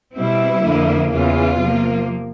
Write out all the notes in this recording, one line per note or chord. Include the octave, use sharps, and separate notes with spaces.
B2 G3 C4 E4
F2 D3 F3 A#3
E2 C#3 E3 F4
C3 F3 A#3